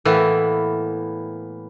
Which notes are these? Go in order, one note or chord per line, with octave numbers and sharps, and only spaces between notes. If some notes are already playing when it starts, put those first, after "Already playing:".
A2 E3 A#3 B3